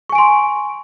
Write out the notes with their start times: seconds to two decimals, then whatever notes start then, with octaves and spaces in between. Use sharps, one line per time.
0.09 C#6
0.12 G#5
0.15 D7
0.18 C6